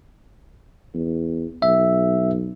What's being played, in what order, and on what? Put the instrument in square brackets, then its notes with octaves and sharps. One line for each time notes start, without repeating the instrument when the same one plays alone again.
[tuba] E2
[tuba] B1 [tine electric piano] E5